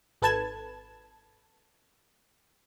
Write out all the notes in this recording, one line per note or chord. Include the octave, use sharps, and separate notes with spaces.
G#1 A4 B4 A5 G#6 E7